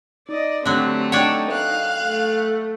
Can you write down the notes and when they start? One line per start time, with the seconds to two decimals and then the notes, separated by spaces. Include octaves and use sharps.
0.29 D#4 D5 D#5
0.66 D3 F#3 A3 C4 G4 F#6
1.12 D4 D#4 A4 C#5 F#5 G5
1.50 F5 F#6
2.05 A3